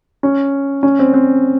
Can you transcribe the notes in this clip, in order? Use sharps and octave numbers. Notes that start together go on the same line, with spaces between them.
C#4
C#4
C4
C4